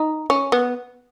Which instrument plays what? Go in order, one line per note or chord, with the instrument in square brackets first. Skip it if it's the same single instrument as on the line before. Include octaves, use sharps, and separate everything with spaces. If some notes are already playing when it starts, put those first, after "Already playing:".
Already playing: [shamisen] D#4
C#4
B3